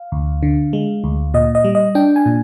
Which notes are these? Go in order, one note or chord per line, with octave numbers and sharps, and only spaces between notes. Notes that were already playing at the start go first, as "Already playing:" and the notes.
Already playing: F5
D2
D3
G#3
D2
A#2 D#5
D#5
G3
D#5
D4 G5
G#5
A#2